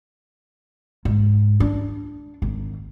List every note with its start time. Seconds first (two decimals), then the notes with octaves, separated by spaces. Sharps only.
1.05 G#2
1.60 D4
2.42 G#1